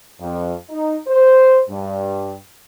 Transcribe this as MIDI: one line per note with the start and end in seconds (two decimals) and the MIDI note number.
0.20 0.53 41
0.70 0.97 63
1.08 1.61 72
1.70 2.34 43